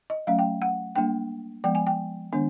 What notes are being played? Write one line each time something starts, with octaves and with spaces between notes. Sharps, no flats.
D#5
F#3 A3 C#4 F5
G5
F#5
G3 A#3 D4 G5
F3 G#3 B3 G5
G#5
G5
D#3 G#3 B3 D4